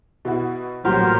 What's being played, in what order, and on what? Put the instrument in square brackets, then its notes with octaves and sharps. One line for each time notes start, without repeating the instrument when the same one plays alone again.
[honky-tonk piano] B2 E4 F#4
[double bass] A1 F#3 [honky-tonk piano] A#2 F#4 G4 [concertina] A#4 C5 F6